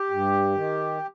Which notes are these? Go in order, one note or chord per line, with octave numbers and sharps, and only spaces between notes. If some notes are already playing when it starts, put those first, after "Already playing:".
Already playing: G4
G2
D#3